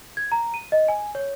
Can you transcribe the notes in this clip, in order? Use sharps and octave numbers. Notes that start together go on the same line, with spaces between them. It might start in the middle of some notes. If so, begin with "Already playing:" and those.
G#6
A#5
D#7
D#5
G#5
C#5